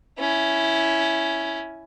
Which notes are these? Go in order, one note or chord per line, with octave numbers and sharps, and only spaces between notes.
C#4 E4